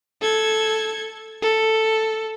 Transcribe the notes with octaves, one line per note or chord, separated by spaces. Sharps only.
A4 G#6
A4